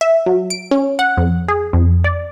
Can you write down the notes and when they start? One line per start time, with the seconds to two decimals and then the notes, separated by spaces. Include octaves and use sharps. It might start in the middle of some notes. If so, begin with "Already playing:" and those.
0.01 E5
0.26 F#3
0.50 D7
0.71 C#4
0.99 F#5
1.17 F2
1.48 G#4
1.73 F2
2.04 D5